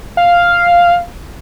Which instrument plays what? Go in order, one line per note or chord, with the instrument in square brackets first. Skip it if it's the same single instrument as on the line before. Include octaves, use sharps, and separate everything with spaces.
[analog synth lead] F5